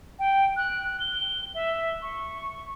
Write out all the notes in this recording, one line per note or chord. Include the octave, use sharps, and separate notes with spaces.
G5
F#6
G7
E5
C#6